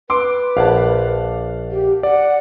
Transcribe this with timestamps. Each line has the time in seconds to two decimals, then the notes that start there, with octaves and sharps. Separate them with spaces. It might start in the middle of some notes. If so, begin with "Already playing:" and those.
0.10 B4 C6 D6
0.57 A#1 F5 F#5 A5
1.72 G4
2.03 D5 F#5